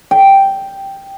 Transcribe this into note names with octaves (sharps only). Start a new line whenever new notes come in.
G5